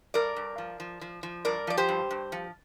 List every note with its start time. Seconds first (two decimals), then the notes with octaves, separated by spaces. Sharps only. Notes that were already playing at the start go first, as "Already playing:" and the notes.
0.14 G2 A#4 D5
0.37 G2
0.58 F3
0.80 F3
1.01 F3
1.23 F3
1.45 G2 A#4 D5
1.67 F3 D5
1.77 G4 C5
1.89 G2
2.11 G2
2.32 F3